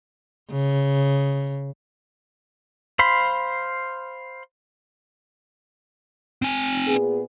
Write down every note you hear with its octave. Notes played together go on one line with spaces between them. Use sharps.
C#3
C5 F5 B5 C6
C4 G#5
A#2 B3 G#4